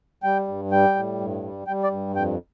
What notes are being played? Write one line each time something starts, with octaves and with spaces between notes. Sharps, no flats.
G3 G5
G2
G3 G5
A2
G2
G3
G3 G5
D5
G2
F2 G5